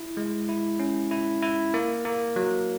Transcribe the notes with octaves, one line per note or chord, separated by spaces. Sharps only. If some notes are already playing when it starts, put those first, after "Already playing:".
Already playing: E4
G#3
E4
C#4
E4
E4
A#3
A#3
F#3